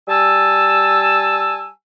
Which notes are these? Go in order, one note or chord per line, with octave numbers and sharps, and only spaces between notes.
G3 G#5 A5 E6